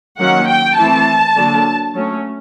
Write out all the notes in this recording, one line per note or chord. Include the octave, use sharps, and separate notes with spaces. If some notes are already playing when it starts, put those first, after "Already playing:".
D#3 F#3 A#3 C#4 F#5
G5
E3 A3 C4 A5
D3 F#3 A#3 D4
F#3 A3 C#4